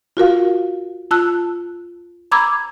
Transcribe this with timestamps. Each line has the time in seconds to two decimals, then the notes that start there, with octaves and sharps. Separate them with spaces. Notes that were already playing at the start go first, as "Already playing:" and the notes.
0.17 F4 F#4 A#4 F5
1.11 F4 A5 E6 F#6
2.32 A#5 B5 D6 E6 G#6